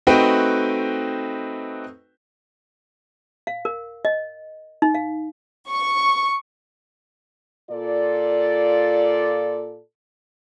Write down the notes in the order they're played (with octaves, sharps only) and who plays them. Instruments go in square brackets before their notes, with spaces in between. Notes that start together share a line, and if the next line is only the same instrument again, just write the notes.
[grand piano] A3 C4 D#4 F#4 B4 G5
[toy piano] F5
A#4
D#5
D#4
F5
[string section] C#6
[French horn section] A#2 F4 A4 D5